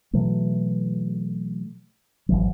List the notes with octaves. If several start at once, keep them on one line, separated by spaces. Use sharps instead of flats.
B2 E3 F#3 A3
G#1 D2 E3 F#3